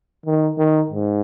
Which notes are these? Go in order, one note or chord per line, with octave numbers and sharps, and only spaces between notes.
D#3
D#3
G#2